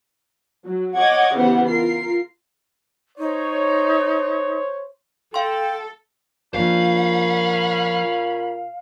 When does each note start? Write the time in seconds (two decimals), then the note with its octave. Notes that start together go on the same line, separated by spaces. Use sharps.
0.64 F#3
0.97 C#5 D#5 F#5 D6 G#6
1.34 C#3 E3 B3 G4 C5 F#5
1.68 F4 A#4 C7
3.19 D#4 C5 C#5
5.34 A4 F5 G5 C6
6.54 A#2 F3 A#3 C#4 D4 F5 B5